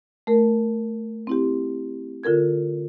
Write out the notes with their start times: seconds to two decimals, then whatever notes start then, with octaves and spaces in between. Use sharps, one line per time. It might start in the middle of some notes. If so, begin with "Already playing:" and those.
0.27 A3 A#4
1.27 C4 E4 G4
2.23 D3 F4 A4 A#4 G#6